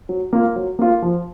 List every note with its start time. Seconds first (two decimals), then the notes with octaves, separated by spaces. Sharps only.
0.09 F#3
0.33 A#3 F4
0.56 F#3
0.79 A#3 F4
1.02 F3